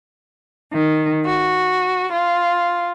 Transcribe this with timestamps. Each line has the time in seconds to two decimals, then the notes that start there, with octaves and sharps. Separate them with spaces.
0.72 D#3
1.25 F#4
2.11 F4